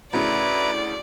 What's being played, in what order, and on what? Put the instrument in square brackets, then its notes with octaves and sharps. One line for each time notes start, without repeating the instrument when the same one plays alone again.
[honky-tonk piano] D2 A2 C#3 [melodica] E4 B4 A#5 [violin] D5